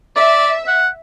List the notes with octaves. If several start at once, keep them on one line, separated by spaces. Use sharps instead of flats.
D5 E5
F#5